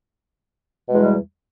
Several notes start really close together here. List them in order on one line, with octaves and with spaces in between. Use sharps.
B2 G#3 E2 G3